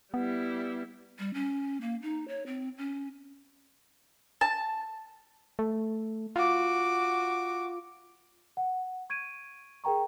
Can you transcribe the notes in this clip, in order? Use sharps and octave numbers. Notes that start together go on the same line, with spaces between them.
G3 B3 E4
G3
C#4
A#3
D#4
C#5
C4
C#4
A5
A3
F4 F#4 D6
F#5
C#6 G#6 D7 D#7
G#4 A#4 G5 A#5 C#6